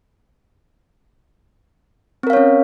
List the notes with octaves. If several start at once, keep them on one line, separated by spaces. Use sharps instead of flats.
C4 C#4 A#4 C#5 F5